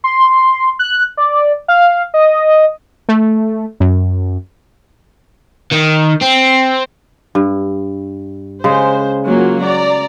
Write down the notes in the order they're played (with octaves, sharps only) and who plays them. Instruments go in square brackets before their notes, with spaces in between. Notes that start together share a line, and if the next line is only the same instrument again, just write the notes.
[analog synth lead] C6
F#6
D5
F5
D#5
[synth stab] A3
F#2
[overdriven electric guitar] D#3
C4
[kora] G2
[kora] C#3 G#3 [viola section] C5
[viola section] F#3 A#3 F4
D5 A#5